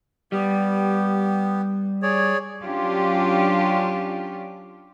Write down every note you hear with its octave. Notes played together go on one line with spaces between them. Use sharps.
G3 B3 G4
G#4 C#5 D5
F#3 C#4 D4 F4 G4